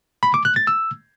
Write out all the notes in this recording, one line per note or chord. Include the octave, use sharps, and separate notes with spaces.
B5
D6
F#6
A6
E6